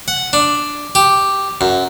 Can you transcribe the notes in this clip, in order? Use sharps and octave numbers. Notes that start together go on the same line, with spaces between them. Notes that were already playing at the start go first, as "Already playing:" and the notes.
F#5
D4
G4
F#2